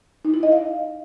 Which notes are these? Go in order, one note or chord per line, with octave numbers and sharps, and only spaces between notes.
D#4
E4
D#5
F5